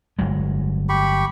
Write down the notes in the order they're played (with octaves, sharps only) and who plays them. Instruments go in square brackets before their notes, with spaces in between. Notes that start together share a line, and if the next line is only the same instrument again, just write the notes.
[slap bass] G1 F#3 G#3
[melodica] G4 B5 C#6